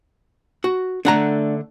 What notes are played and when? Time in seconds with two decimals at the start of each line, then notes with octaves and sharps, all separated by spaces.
0.64 F#4
1.05 D3 A3 D4 F#5 A#5